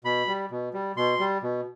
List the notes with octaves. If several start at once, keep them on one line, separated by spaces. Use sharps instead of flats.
B2 B5
G3
B2
G3
B2 C6
G3
B2